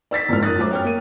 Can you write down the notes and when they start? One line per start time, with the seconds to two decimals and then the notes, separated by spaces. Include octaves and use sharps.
0.11 D5 E6 A6 B6
0.29 F#1 F2 G#2 E4 F6
0.43 A#4 D#6 F#6 A6
0.57 F#2 F#3 A3 C5 D6
0.71 C#5 G5 F6
0.84 A#3 D#7